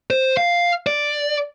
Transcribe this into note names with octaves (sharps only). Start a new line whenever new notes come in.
C5
F5
D5